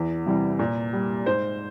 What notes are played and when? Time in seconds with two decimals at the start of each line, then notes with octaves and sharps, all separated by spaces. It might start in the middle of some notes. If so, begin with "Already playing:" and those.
Already playing: E2
0.26 C3 E3 G3
0.59 A#2
0.93 G3
1.26 G#2 C5